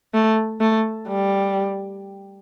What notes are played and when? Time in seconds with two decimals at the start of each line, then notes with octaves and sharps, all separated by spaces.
0.14 A3
0.61 A3
1.08 G3